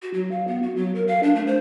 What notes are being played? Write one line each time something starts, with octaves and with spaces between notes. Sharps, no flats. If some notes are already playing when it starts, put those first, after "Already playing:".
F#4
F#3
F5
B3
F#4
F#3
A#4
F5
D4
A3
C5